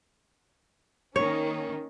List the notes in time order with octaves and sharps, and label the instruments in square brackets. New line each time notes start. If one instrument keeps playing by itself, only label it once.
[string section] D#3 A#3 C#4 [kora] C#5